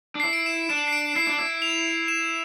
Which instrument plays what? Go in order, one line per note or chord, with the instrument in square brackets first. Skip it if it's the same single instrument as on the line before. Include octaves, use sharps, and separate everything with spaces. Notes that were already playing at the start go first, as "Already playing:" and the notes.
[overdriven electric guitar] D4
[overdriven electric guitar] E4 [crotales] C7
[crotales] D7
E7
[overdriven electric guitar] D4 [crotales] E7
[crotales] C7
D7
[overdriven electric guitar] E4 [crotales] C7
[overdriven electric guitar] D4
E4
[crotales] F7
E7